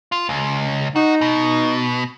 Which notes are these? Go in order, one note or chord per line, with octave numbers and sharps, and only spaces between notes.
F4
C#2
D#4 F#4
B2